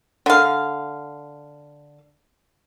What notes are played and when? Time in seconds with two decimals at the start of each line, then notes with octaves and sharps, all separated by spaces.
0.26 D3 F5